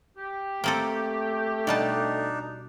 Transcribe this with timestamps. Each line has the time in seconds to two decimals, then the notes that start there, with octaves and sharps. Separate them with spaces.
0.18 G4
0.64 A3 A#3 C4 A4
1.67 B2 G3 D4 D#4 A5